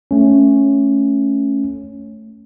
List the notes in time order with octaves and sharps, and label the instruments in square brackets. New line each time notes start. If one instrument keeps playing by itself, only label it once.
[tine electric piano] A3 C#4